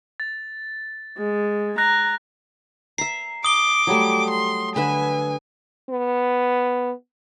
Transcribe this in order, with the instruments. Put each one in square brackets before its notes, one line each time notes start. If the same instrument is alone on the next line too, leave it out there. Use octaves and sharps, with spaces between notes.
[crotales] A6
[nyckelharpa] G#3
[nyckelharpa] A#5 [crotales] F#6 A#6
[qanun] E5 A#5 [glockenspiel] C7
[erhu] D6 [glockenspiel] D#6 G7
[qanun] F#3 G3 A3
[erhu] C6
[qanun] D3 B4 E5 [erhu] G#5
[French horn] B3